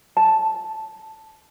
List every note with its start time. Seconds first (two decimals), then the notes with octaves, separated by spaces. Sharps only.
0.17 A5